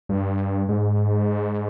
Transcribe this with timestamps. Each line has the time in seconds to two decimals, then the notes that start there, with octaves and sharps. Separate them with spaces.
0.09 G2
0.69 G#2